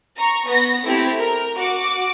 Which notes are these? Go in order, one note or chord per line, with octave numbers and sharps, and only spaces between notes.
A#5 C#6
B3 A#6
A3 C4 E4 G4
A#4
F#4 D6